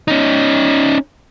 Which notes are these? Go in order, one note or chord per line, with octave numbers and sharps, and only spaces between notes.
C#4 D#4